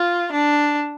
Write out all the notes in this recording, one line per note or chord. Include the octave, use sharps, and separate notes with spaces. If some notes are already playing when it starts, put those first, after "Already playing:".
Already playing: F4
D4